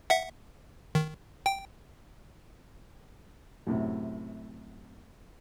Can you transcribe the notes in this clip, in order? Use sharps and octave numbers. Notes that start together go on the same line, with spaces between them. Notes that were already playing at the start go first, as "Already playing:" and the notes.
E5 F#5
D#3
G5
F#2 A2 C3